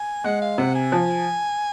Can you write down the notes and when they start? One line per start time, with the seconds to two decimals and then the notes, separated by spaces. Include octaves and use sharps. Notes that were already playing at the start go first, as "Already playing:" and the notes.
Already playing: G#5
0.24 G#3 F#5
0.42 F5
0.58 C3 F#5
0.76 G#5
0.92 F3